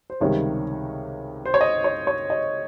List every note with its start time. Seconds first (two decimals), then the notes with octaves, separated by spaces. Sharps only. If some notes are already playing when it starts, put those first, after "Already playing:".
0.10 C5
0.21 C#2 C3 D#3 G3 C#5
1.45 C5
1.54 C#5
1.61 D#5
1.84 C#5
2.07 C#5
2.30 D#5